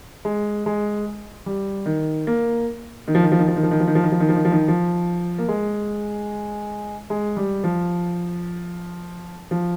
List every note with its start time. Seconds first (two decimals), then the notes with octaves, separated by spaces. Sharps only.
0.25 G#3
0.66 G#3
1.46 G3
1.86 D#3
2.27 A#3
3.08 D#3
3.15 F3
3.23 D#3
3.32 F3
3.39 D#3
3.48 F3
3.56 D#3
3.63 F3
3.71 D#3
3.80 F3
3.87 D#3
3.95 F3
4.04 D#3
4.12 F3
4.20 D#3
4.29 F3
4.36 D#3
4.45 F3
4.52 D#3
4.68 F3
5.38 A#3
5.48 G#3
7.10 G#3
7.37 G3
7.64 F3
9.51 F3